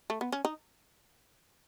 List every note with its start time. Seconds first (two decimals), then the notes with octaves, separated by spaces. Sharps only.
0.10 A3
0.21 B3
0.32 C#4
0.45 D#4